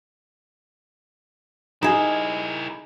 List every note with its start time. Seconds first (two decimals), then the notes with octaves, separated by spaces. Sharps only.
1.83 D#4 E4 G#4 A#4